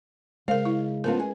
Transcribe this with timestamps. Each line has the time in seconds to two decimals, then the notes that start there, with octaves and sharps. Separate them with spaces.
0.48 C#3 G#3 A#4 C5 F5
0.65 E4
1.04 F3 B3 C#4 F4 A#4
1.20 G#4